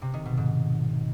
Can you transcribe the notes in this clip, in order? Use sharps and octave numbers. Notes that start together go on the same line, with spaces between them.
C3
D#3
B2
G#2